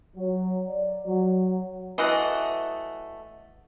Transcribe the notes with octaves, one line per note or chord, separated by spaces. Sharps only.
F#3
D5
F#3
E3 F#3 A3 D#5 F#5